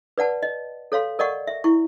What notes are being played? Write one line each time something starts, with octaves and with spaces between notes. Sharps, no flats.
B4 D5 F#5 A5
D#5
A4 C#5 F5 C6
A#4 D5 D#5 F#5 C#6
E5
E4 C#6